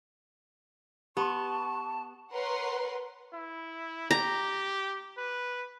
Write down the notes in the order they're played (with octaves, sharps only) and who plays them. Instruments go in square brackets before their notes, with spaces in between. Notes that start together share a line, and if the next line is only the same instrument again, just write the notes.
[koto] B3 [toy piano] G4 C6 [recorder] A5 [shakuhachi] C#6
[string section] A#4 B4 C#5 F#5 C6
[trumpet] E4
[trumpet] G4 [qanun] A#5
[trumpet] B4